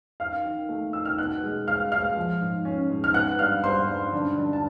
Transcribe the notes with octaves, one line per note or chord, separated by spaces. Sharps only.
D#3 F5 F6
D#3
A3
D#3 E6
F6
B2 F#5 F#6
G#3
G#3 F5 F6
G#3 F5 F6
F3
G#2
C#4
G#2
F6
B3 F#5 F#6
G2 F5 F6
G2 C5 C6
G2
D3
D3
A5